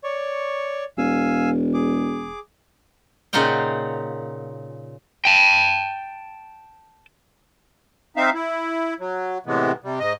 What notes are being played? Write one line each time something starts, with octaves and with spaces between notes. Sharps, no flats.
C#5 D5 C#6
E1 F5 G#5 E6
G#4 D6
A#2 C#3 D#4 F4 F#5 G5
G5 A5
C4 D#4 E5 F5
E4
F#3
A2 C3 E3 G#3 B3
C3 G3
G#2 D#5